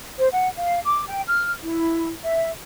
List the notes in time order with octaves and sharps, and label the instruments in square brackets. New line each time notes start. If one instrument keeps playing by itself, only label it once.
[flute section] C5
F#5
F5
D6
G5
F6
E4
E5